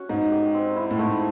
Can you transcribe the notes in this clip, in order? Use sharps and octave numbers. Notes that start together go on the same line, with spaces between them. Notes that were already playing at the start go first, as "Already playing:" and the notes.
Already playing: C#4 F#4
G#2 D#4
G4
C4
E4
A2
G#2 A3